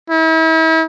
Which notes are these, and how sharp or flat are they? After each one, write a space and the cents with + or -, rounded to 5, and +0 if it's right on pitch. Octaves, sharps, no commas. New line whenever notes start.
E4 -40